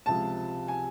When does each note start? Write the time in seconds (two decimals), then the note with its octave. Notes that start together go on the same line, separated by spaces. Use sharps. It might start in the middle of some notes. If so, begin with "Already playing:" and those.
0.06 C#2 C3 F3 A5
0.68 G#5